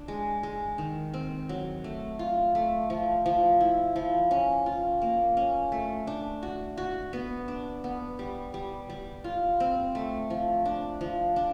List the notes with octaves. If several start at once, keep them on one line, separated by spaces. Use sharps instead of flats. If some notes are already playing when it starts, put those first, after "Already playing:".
Already playing: D4
G#3
G#3
D#3
C4
F#3
A3
F4
A3
F3
F3
E4
F3
C#4
F4
A#3
C#4
A3
D4
F#4
F#4
B3
D4
B3
G3
G3
G3
F4
C4
A3
F3
D4
F3
D4